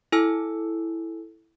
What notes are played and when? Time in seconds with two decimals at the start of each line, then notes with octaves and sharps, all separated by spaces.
0.12 E4 A4 G#5 E6